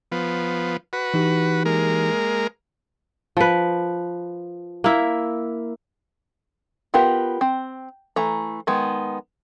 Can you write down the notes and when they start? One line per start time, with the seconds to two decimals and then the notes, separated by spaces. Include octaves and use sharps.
0.12 F3 B3
0.93 F#4 B4
1.14 E3 D#4 G4
1.65 G#3 A#3 A#4
3.37 F3 B4
4.84 A#3 E4
6.94 B3 F4 G4 A#4 B4
7.41 C4
8.16 E3 A3 A#5
8.67 D#3 G#3 B3